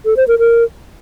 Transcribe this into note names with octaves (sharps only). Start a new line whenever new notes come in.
A4
C5
A#4
A#4